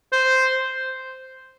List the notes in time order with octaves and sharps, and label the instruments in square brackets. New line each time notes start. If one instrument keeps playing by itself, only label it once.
[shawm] C5